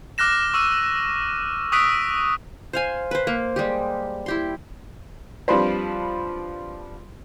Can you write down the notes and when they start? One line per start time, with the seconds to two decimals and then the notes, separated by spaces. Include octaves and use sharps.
0.18 D6 F6 F#6 A#6 E7
0.54 C#6 E6 D#7
1.72 C#6 D#6 E6 F#6 B6 D7
2.73 C5 F5 G#5
3.11 B4 C5
3.27 A#3
3.56 G3 G#3 G4
4.26 E4 G4 C6
5.48 F3 G3 C4 D4 B4 C5